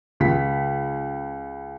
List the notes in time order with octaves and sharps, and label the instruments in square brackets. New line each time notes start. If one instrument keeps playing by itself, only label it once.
[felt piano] C#2 B6